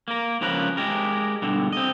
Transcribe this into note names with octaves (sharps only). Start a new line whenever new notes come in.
A#3 A#4
C#2 F3 C#4 A#4 B4
G#3 G4 A#4
G2 B2 D3
C4 D#5